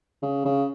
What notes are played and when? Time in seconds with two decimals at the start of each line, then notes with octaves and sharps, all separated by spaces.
0.22 C#3
0.45 C#3